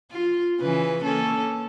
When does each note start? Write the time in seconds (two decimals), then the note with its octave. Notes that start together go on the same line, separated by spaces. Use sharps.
0.11 F4
0.61 C#3 E3 B4
1.03 A#3 C#4 A4